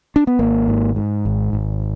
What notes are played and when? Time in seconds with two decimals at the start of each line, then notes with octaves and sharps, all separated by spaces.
0.16 D4
0.27 B3
0.39 G#1 A#3
0.68 G#2
0.96 G#2
1.25 G#1
1.53 G#1